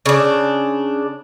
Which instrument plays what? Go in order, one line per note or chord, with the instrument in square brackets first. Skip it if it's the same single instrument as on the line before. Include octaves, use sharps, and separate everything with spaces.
[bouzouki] C#3 D4